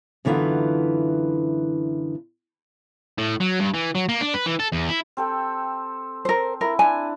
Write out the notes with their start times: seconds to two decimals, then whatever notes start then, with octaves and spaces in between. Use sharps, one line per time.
0.25 F#2 D3 E3 B3 E4 F4
3.18 A2
3.41 F#3
3.60 G2
3.74 E3
3.95 F#3
4.09 A#3
4.21 D4
4.34 B4
4.46 E3
4.60 A4
4.72 E2
4.89 E4
5.17 C4 A4 G5
6.25 A#4 C5
6.61 E4 A#4
6.79 D4 G#5